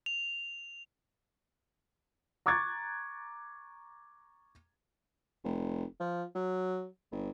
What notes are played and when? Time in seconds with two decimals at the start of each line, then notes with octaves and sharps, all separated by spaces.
0.06 F7
2.46 A#5 C#6 D6 F#6 G#6 A6
5.44 F1
6.00 F3
6.35 F#3
7.12 G1